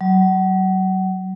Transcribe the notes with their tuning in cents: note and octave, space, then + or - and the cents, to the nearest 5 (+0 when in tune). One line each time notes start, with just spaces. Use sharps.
F#3 +30